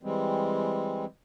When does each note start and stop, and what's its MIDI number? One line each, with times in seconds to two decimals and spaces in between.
0.03 1.05 52
0.03 1.05 55
0.03 1.05 56
0.03 1.05 60